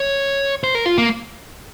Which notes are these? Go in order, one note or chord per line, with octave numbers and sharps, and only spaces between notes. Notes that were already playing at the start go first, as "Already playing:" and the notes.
Already playing: C#5
C5
A#4
F4
A#3